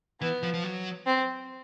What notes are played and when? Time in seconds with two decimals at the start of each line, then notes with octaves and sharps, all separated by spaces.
0.21 E3 B3
0.43 F3
0.54 F3
0.64 F#3
1.06 C4